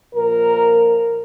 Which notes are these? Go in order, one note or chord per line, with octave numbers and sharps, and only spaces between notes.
A#2 F3 A#4